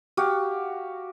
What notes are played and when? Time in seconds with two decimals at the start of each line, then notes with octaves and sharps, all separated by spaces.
0.17 F#4 G4 F5